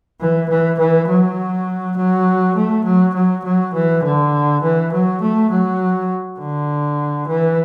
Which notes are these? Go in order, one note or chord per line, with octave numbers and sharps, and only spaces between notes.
E3
E3
E3
F#3
F#3
A3
F#3
F#3
F#3
E3
D3
E3
F#3
A3
F#3
D3
E3